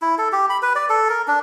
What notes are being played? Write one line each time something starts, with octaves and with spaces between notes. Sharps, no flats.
E4
A4
G4
B5
B4
D5
A4
A#4
D4